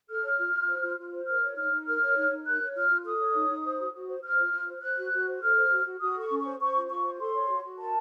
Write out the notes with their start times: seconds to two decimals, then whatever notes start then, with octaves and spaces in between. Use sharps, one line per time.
0.09 A4 F6
0.24 C#5
0.39 F4
0.54 F4
0.69 C5
0.83 F4
0.98 F4
1.13 C5
1.27 A#4 F6
1.42 C#5
1.57 D#4 F6
1.72 D#4
1.87 A#4 F6
2.01 C#5
2.16 D#4
2.31 D#4
2.46 A#4 F#6
2.61 C#5
2.75 F4 F6
2.91 F4
3.05 A4 D#6
3.20 C#5
3.35 D#4
3.50 D#4
3.64 C5
3.79 F#4
3.94 F#4
4.09 C5
4.23 C5 F6
4.38 F4
4.53 F4
4.68 C5
4.83 C5 F#6
4.98 F#4
5.12 F#4
5.27 C5
5.42 A4 F6
5.57 C5
5.72 F#4
5.86 F#4
6.01 F#4 D#6
6.17 A4 C#6
6.31 C#4
6.40 C#6
6.45 C5
6.60 C5 C#6
6.76 F4
6.89 F4 C#6
7.04 C5
7.20 A4 C6
7.34 C#5
7.50 F#4
7.64 F#4
7.78 A#4 A5